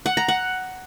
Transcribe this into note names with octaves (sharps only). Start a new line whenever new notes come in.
F#5
A#5
F#5